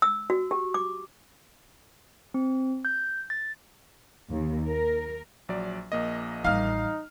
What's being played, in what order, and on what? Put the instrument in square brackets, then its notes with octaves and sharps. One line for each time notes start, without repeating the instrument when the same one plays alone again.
[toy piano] E6
F#4
G4
D6
[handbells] C4
G6
A6
[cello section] D#2
A#4
[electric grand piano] A#1 F#3 D5
A#1 A#3 D#5
[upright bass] A1 G3 [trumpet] D#4 [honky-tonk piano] F5 F6